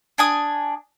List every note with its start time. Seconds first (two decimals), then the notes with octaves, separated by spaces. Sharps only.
0.18 D4 G#5 D#6